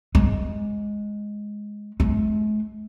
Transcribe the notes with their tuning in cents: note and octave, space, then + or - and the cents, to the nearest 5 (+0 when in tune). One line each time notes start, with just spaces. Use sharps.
G#3 +0
G#3 +45